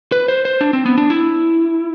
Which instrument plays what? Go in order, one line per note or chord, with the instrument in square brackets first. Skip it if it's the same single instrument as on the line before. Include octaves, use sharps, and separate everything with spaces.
[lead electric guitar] B4
C5
C5
D4
C4
B3
D4
E4